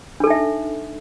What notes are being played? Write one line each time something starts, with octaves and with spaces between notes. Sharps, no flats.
D4 D#4 A4 E5